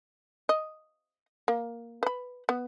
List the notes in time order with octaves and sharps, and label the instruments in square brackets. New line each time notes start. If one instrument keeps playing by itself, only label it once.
[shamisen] D#5
A#3
B4 B5
B3